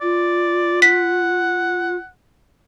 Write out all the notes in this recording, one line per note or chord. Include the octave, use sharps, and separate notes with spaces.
F4 D5
F#5 B6